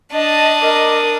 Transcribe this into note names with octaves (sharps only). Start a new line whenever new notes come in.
D4 D#5 A5 D#6
A#4 D#5 D6